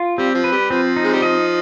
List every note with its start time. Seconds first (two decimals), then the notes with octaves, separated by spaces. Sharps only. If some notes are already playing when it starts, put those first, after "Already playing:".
Already playing: F4
0.18 G3 C4
0.35 F3
0.44 B4
0.52 G3
0.70 F3 C4
0.96 D#4
1.04 G#3
1.13 G3
1.22 F3 D#5